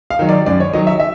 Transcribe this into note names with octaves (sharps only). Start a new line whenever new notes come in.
F5
D#3 F#3
D5
F#2 D5
C#5
D#3 F#3 D#5
E5
E5